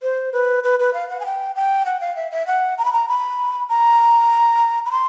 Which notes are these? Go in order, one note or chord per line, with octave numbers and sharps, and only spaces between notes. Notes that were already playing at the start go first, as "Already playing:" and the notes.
C5
B4
B4
B4
F5
F#5
G#5
G5
G5
F#5
F5
E5
E5
F#5
A#5
B5
A#5
B5
A#5
B5
C6